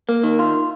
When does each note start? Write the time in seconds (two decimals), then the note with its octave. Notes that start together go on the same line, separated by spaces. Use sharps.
0.09 A#3
0.24 D#3
0.39 F4